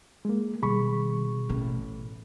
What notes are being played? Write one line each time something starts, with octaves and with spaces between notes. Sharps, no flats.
G#3 A#3
B2 D#3 G3 G#4 B5 C#6
A1 A2